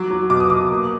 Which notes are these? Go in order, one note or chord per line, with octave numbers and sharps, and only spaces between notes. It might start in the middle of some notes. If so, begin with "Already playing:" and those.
Already playing: F#3 D6
F#3
B2 D6
D#6
B2 D6
A#3